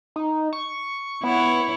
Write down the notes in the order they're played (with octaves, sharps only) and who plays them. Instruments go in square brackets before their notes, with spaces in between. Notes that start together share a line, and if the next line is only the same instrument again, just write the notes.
[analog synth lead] D#4
C#6
[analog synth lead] B3 [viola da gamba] E4 C#5